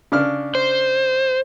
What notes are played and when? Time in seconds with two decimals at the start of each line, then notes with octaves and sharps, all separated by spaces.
0.12 C#3 D4 F6
0.55 C5